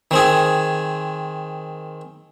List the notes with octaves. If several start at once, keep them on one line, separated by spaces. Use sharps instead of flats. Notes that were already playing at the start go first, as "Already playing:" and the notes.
D#3 C4 G#4